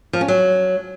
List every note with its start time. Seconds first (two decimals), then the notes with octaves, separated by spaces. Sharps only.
0.13 F3
0.21 C#4
0.28 F#3